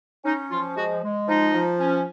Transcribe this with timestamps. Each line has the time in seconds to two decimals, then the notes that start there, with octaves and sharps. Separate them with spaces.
0.24 C#4 D#4
0.51 F3 F4
0.77 G#3 F#4
1.03 G#3
1.28 F3 D#4
1.54 F3
1.80 C#4